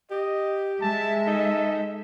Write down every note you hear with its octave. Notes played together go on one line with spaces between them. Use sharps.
G4 D#5
G#3 E5 A5
D#4 A4